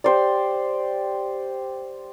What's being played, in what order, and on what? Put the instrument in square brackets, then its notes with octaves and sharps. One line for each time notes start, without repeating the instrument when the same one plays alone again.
[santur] G4 C5 D5